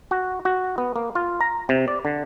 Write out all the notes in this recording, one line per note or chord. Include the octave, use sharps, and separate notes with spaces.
F#4
F#4
B3
A#3
F4
A#5
C3
D5
D3